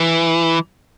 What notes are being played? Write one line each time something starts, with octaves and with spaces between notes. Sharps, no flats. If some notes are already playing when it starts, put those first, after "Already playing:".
Already playing: E3